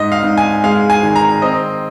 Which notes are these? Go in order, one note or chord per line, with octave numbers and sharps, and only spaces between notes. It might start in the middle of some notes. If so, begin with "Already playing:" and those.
Already playing: G#2 D#5
F5
G#2
G#5
G#3 F5
G#5
D#3
A#5
C4 D#5